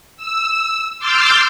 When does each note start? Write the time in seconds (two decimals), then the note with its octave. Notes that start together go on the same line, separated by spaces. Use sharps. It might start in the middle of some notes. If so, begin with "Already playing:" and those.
0.17 E6
0.99 C6 D6 E6 F6 G6 A6